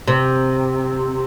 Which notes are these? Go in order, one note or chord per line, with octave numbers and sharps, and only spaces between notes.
C3